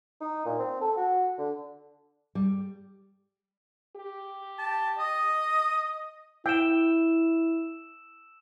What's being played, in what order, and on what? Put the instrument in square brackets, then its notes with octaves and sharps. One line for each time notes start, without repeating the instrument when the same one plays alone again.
[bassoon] D#4
A#2
C4
A4
F#4
D3
[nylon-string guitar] G3
[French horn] G4
[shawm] A5
D#5
[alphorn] E4 [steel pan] G5 [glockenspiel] E6 E7